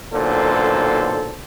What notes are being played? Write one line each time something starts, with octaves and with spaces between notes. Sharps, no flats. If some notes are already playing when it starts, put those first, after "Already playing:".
B1 A#2 D3 A4 C5